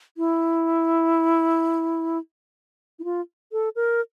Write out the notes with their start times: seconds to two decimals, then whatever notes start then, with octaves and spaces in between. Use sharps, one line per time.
0.17 E4
2.99 E4
3.04 F4
3.52 A4
3.76 A#4